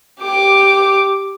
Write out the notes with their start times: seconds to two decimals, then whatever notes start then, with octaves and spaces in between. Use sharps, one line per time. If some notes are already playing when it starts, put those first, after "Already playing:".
0.20 G4 D6